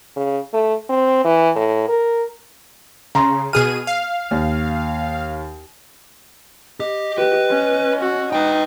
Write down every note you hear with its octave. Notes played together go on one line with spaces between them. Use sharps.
C#3
A3
C4
E3
A2
A#4
C#3 A#5 C6
B2 G#4 F6 D#7
F5
D#2
G4 D#5
G4 B4
C#4
F#4
D#4 B4 G5